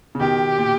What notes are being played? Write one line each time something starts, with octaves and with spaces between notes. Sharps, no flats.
C#3
B2 D#3 G4
A#2